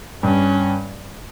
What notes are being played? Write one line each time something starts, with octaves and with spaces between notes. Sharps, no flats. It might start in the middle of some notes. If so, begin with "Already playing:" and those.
G2 C#4